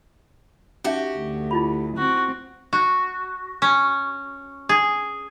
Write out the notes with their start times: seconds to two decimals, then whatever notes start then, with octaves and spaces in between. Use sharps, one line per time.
0.84 C#4 D#4 F#4 G4 E5
1.18 D2
1.51 E4 F4 B5
1.98 C4 F#4
2.73 F#4
3.62 C#4
4.69 G#4